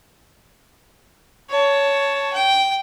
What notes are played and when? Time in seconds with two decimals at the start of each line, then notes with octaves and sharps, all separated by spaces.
1.49 C#5 A5
2.33 G5